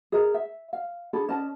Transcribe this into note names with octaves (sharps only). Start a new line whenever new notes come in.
G#4 A#4 D#5 A#5
E5
F5
D4 G#4 A4 B5
C#4 D5 D#5 A5